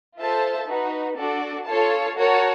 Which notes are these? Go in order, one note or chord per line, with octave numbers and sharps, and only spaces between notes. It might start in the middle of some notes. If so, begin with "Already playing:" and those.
F4 A4 C5 E5 A5
D#4 F#4 B4
D4 F#4 A4 D5
F4 A4 C#5 F5 A5
F#4 A#4 C#5 F#5 A5